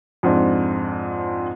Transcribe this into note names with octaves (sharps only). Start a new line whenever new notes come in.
F2 G#2 C4 D4